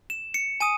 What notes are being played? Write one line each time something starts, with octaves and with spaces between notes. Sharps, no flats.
E7
C#7
G#5 D#6 D#7